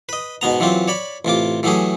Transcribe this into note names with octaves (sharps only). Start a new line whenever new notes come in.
B4 D#5
G#2 B2 B3 A#5
E3 F#3 C4 F4 G4
C#5 D5 B5
A1 C3 F4 D6
E3 F#3 A3 G4 G#4